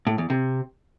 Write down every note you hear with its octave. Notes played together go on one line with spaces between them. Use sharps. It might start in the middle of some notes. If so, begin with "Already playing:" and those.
A2
E2
C3